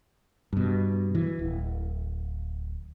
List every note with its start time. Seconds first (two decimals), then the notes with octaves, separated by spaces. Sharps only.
0.53 G2 B2
1.15 E3
1.39 D1